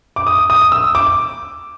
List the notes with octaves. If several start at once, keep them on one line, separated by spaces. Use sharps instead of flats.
D6
D#6
D#6
E6
D6